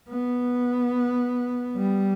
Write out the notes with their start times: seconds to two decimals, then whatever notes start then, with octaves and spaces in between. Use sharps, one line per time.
0.09 B3
1.76 G3